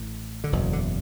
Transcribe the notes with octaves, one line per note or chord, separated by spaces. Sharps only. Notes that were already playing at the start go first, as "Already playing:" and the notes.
Already playing: A1 A2
D3
F#1 E2 B2 E3
D3